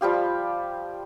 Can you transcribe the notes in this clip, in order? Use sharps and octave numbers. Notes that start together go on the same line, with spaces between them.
F3 G3 G4 F5